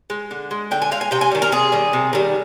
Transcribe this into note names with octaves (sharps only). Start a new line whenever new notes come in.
G#3
D3
G#3
D3 G5
G#5
G#3 F5
G#5
C3 G5
G#5
D#3 G3
A#4
C3 G#4
D#3 G3
C3
D#3 G3